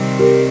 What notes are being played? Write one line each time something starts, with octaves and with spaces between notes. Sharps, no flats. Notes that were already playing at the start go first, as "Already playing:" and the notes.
Already playing: C3 D#3 G3 C4
G4 A#4